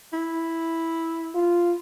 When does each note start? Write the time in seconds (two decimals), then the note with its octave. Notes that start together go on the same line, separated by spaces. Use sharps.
0.13 E4
1.35 F4